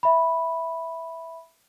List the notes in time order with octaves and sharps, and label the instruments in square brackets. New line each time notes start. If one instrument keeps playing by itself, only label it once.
[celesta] E5 B5